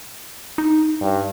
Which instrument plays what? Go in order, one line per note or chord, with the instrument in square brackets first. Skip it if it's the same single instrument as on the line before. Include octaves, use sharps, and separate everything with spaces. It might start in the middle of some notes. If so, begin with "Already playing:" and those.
[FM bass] D#4
[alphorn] G2